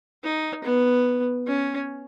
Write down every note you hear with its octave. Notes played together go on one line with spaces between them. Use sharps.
D#4
B3
C#4